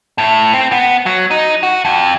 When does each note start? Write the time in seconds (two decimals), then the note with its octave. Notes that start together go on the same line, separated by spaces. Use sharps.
0.18 A2
0.54 C4
0.72 B3
1.06 F#3
1.31 D#4
1.63 F#4
1.85 F2